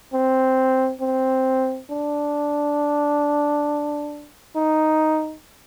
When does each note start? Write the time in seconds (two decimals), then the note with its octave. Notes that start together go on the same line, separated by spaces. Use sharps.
0.13 C4
1.01 C4
1.90 D4
4.56 D#4